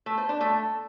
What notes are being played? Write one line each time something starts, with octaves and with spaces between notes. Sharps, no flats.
A3
C5
D4
A3